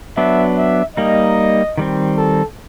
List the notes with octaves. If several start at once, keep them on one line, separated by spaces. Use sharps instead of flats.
F#3 B3 D4 E5
E5
G3 A#3 D#4 D#5
D#3 G3 C4
A4